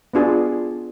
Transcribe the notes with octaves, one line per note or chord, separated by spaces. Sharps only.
B3 D4 F4 G#4